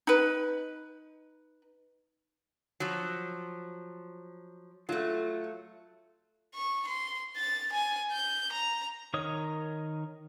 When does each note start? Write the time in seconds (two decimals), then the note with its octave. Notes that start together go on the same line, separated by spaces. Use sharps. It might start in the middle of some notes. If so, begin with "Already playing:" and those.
0.07 D#4 B4
2.80 F3 F#3
4.89 F#3 A3 F4
6.54 C#6
6.87 C6
7.37 A6
7.72 G#5
8.12 G6
8.52 A#5
9.14 D#3 A#4 C#5 D#5 D#6